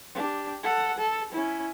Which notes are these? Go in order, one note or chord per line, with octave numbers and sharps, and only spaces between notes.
D4 G4
A4 F#5
A4
C#4 E4